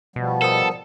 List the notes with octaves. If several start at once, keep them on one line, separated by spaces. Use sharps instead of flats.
B2 F3 G3 B3
A4 A#4 C5 D#6